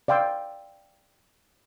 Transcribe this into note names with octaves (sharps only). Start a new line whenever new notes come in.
D5 F5 G5 C6 E6